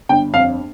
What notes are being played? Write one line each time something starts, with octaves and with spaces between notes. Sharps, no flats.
G1 G5
F2 F5